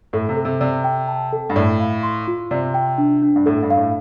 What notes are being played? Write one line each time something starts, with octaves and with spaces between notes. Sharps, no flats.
A2 A4
C3
A4
C3
C3 D5
G5
A5
A4
G2
A2 D5
F5
C6
F4
C3 D5
G5
D4
D4
G2
A2 A4
G2
F5
A2